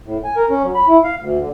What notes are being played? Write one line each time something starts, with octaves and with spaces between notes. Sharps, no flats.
A2
G#5
A#4
C#4
F#3
B5
E4
F5
D2
D3